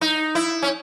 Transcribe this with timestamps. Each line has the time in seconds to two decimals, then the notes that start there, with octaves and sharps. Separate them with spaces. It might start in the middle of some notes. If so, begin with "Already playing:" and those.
0.01 D#4
0.35 E4
0.62 C#4